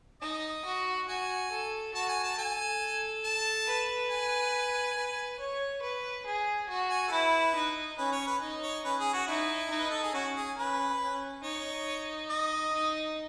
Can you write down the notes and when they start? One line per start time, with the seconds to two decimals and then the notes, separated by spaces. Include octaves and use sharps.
0.22 D#4 D#5
0.65 F#4
1.08 F#4 G#5
1.51 A4
1.94 F#4 A5
2.09 G#5
2.23 A5
2.37 A4 G#5
3.24 A5
3.67 B4
4.10 G#5
4.97 B4
5.39 C#5
5.82 B4
6.26 G#4
6.69 F#4
6.90 G#5
7.08 A4
7.11 E4 B4
7.55 D#4
7.98 C#4 B4
8.12 C#5
8.27 B4
8.41 D#4
8.63 C#5
8.84 C#4 B4
9.00 G#4
9.14 F#4
9.28 D#4 E4
9.70 D#4
9.78 B4
9.90 A4
10.03 G#4
10.14 C#4 F#4
10.36 G#4
10.57 C#4 B4
11.00 C#4
11.43 D#4 C#5
12.30 D#5
12.73 D#4